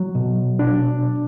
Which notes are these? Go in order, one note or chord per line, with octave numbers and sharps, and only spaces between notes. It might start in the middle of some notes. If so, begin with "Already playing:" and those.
Already playing: F#3
B2
D4